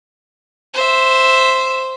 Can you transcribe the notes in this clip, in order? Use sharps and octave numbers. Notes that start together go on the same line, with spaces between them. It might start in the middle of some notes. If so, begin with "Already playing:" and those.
C5 E5